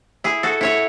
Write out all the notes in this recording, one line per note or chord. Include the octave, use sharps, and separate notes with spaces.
E4 G#4
F#4 A4
E4 C#5 E5